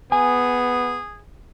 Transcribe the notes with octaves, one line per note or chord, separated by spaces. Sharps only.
B3 G#4 G#5